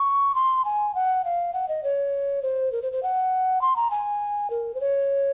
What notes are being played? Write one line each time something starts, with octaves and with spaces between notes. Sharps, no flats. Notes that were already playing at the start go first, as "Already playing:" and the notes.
Already playing: C#6
C6
G#5
F#5
F5
F#5
D#5
C#5
C5
A#4
C5
C5
F#5
C6
A#5
G#5
A#4
C5
C#5